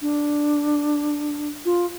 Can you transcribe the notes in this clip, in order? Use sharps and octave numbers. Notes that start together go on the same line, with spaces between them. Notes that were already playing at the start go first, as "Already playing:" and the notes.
D4
F4